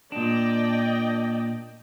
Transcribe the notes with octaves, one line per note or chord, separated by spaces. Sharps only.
A#2 D4 D5 D#5 G5